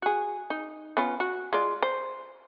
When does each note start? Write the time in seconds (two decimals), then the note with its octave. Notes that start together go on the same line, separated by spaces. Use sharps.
0.02 F#4 G#4
0.50 D#4
0.97 B3 C#4 F4
1.20 F#4
1.53 G#3 F4 D5
1.82 C5